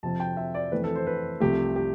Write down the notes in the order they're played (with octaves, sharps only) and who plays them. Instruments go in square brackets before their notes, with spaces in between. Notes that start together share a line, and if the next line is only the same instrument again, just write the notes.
[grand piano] F2 C3 F3 C4 A5
G5
E5
D5
F2 E3 A3 C4 B4
A4
C5
B4
C2 C3 F3 A3 G4
G4